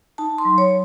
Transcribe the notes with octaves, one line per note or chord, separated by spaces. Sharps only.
D#4 A5
C6
F#3
C#5